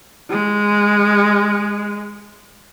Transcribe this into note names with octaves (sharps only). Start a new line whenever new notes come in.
G#3